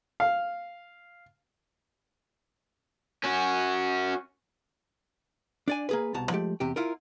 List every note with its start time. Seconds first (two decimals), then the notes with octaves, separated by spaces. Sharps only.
0.20 F5
3.24 C#4 F#4
5.68 D4 D5 G#5
5.89 A#3 G#4 B4
6.14 C2 B2 A5 A#5
6.30 F3 G#3 A3 G4
6.60 E2 C3 G4
6.76 E4 F4 A#4